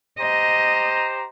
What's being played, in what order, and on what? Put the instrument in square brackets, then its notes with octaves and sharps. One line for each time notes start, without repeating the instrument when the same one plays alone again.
[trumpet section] G4 C5 A#5 [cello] D#5